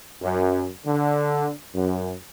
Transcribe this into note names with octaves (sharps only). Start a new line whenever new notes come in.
F#2
D3
F#2